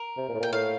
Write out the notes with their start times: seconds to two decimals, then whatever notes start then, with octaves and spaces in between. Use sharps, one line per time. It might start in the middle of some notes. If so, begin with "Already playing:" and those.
Already playing: A#4
0.17 C3
0.29 A#2
0.34 A2
0.40 A#2 G5
0.52 A2 F5